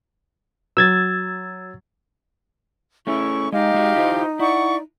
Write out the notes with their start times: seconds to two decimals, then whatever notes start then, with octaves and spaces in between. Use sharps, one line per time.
0.77 F#3 E6 G#6 A6
3.07 A3 C#4 E4 G#4 C#6
3.52 G#3 D#4 G4 D#5 F5
3.74 G#3 F#4
3.95 E4 F4 C5
4.39 E4 D5 F#5 C#6